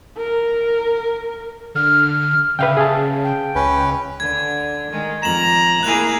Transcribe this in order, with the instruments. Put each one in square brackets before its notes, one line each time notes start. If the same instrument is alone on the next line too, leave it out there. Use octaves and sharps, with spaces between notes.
[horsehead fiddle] A#4
[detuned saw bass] D3 [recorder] F6
[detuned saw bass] C#3 [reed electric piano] B4 F5 G5 [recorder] E5
[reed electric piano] G#4 F5 A5
[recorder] G5
[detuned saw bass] C#2 [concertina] C#4 B4
[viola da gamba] D3 [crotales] G#6
[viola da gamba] D#3 G#3
[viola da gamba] F2 [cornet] A#5 [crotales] E7 F#7
[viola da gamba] A#3 E4 G#4 [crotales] F#6 F7